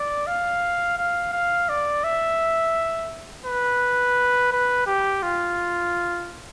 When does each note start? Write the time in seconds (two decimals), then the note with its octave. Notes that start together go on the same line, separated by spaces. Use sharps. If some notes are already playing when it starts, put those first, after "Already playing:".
Already playing: D5
0.27 F5
0.97 F5
1.33 F5
1.69 D5
2.04 E5
3.45 B4
4.52 B4
4.86 G4
5.22 F4